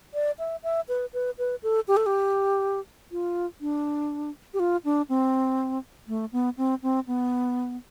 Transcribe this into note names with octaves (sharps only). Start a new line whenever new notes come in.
D5
E5
E5
B4
B4
B4
A4
G4
A4
G4
F4
D4
G4
F4
D4
C4
A3
B3
C4
C4
B3